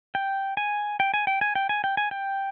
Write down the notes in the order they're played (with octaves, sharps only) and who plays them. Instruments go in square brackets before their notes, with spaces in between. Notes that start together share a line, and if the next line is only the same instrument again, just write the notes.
[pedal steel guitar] G5
G#5
G5
G#5
G5
G#5
G5
G#5
G5
G#5
G5